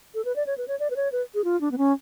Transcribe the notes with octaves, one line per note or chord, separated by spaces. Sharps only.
A4
B4
D5
C#5
B4
C#5
D5
B4
C#5
B4
G#4
F4
D4
B3
C#4